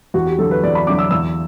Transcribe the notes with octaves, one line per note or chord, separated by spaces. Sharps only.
E2 F#4
G4
D3 F#3 A4
B4
E2 D5
B5
D3 F#3 D6
E6
E2 E6